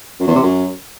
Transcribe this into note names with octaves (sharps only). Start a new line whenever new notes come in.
F#2
E2
C3
F#2